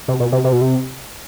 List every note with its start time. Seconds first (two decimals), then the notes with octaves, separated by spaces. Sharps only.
0.08 C3
0.20 B2
0.32 C3
0.44 C3
0.53 B2
0.61 C3